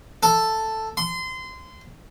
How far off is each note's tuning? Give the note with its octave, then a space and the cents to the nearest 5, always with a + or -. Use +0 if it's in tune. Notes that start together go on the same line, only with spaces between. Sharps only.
A4 +5
C6 -25